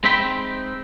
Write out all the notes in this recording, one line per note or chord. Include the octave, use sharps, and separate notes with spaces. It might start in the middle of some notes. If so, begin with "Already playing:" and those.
G#3 C4 D#4 E5 G5 B5